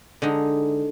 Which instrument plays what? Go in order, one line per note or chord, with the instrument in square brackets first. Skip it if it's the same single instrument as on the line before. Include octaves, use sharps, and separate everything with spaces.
[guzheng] D3 G#3 D#4